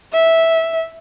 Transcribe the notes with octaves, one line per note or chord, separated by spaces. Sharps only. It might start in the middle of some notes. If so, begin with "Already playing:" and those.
E5